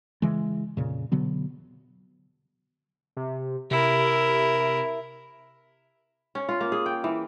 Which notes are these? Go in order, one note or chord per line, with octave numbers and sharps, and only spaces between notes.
C#3 E3 G#3
F2 A#2 C#3
B2 D3 F#3 B3
C3
C3 E4 A#4
C#4
F4
A#3
G#4
G5
E3